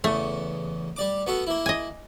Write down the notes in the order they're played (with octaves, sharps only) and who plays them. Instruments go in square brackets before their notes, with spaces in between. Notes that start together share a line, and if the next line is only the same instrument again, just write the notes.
[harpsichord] E2 C#3 [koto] A3
[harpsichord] G3 D5 D6
B3 F#4 A4
A#3 E4
[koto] D#5 G#5